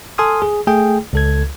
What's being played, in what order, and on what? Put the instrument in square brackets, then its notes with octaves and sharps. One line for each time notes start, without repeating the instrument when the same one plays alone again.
[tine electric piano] A4 G#5 C6 D#6 F6
G#4
A3 G#4 G5
C#2 A4 G#6